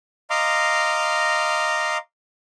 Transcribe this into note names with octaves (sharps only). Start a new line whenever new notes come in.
D#5 F5 A#5 C6 D6